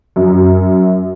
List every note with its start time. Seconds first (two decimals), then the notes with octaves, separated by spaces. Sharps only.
0.16 F#2